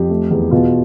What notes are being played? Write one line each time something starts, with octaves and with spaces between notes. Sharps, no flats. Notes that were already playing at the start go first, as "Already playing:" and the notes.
Already playing: F2 G4
A3
E2
B2 F4